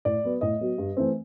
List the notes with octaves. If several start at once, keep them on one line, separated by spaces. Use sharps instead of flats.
A2 D5
F#3 B3
A2 D#5
F#3 B3
G2
E3 A3 C4